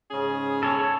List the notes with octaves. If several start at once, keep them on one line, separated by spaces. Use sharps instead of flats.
G#2 C#3 C#4 G#4
A4 C#5